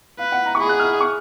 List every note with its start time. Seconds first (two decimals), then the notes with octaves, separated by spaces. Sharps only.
0.19 B4 F5
0.32 F#5
0.46 A#5
0.55 C#6
0.60 G#4 B5
0.69 F#6
0.80 F6
1.01 C#6